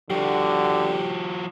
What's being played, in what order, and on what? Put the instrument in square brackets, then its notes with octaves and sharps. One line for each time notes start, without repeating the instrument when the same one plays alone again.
[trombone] D3 [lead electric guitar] F3 F#4 [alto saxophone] G4